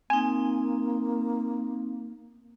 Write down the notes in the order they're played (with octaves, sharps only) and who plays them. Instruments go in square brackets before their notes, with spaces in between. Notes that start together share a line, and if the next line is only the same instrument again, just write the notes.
[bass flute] A#3 [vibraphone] C4 D#4 [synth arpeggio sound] G#5